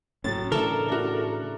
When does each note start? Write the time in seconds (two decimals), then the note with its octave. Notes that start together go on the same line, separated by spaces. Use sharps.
0.24 F#1 A2 F#3 C#4 A6
0.52 A2 C#3 E3 D4 E4 A4 A#4
0.88 D4 E4 F#4